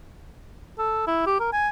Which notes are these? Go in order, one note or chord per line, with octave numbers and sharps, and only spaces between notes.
A4
E4
G4
A#4
G#5